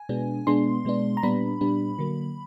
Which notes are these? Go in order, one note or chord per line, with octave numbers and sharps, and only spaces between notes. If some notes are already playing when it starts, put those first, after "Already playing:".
Already playing: G#5
B2 G#3 B3 D4
B2 G#3 B3 D4 C6
B2 G#3 B3 D4
A#5
A#2 G3 B3 D4 B5
A#2 G3 B3 D4
D3 F#3 A#3